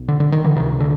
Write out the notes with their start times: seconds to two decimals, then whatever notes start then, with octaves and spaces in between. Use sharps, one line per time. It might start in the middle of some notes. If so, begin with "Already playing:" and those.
Already playing: B1 B2
0.08 D3
0.20 D3
0.32 D#3
0.44 D3 E3
0.56 C#2 C3 D#3
0.80 D3